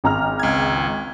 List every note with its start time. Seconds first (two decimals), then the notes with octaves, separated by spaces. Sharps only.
0.04 G#1 A#5 F6
0.40 C#2 G#6